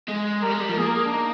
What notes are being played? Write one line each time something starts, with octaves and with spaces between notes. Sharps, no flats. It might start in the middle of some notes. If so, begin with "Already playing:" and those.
G#3
G3 A#4
G#3
G3
F3 A#4
A#3 G#4
A#4
G#4
D4
D#4